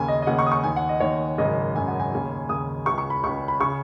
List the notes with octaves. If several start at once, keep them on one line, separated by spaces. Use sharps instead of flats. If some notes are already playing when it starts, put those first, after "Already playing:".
Already playing: D#2 C#3 G#5
D#5
D#5
D#2 C#3 F#5
C#6
D#6
C#6
D#2 D#3 G#5
F#5
D#5
D#2 D#3 C#5
G#1 F#2 C#3 D#5
G#1 F#2 C#3 G#5
F#5
G#5
D#2 C#3
D#2 C#3 D#6
C#2 C#3 C#6
C#6
B5
C#2 C#3 C#6
B5
C#3 C#6